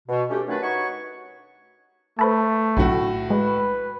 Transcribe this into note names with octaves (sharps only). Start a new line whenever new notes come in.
B2
A3 C#4 D4 G4
D#3 F#3 A3 C#4 D4 B4
D#4 F#4 B4 C#5 C#6
A3 A4 B4 C5
B1 A2 D3 F#3 F#4
G#3 B4